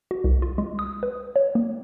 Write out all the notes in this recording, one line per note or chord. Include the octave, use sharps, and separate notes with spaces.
F#4
C2
F4
G#3
D#6
B4
C#5
A#3